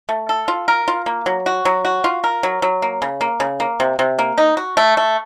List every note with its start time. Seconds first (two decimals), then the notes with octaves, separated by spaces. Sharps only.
0.09 A3
0.29 A4
0.48 F4
0.68 A#4
0.88 F4
1.06 A#3
1.26 F#3
1.46 F#4
1.65 F#3
1.85 F#4
2.04 F4
2.24 A#4
2.43 F#3
2.62 F#3
2.82 A#3
3.02 C#3
3.21 A#3
3.40 C#3
3.60 A#3
3.80 C3
3.99 C3
4.19 A#3
4.38 D#4
4.57 F#4
4.77 A3
4.97 A3